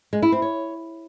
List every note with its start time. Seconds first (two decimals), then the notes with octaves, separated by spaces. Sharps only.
0.13 G#3
0.22 E4
0.32 C4
0.42 C#5